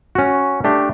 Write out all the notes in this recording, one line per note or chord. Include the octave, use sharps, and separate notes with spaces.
C#4 F#4
A3 D4 G4